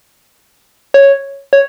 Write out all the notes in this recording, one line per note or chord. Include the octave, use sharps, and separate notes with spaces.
C#5
C#5